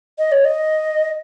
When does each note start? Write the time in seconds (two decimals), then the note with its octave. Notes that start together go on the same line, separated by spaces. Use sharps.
0.19 D#5
0.32 C#5
0.45 D#5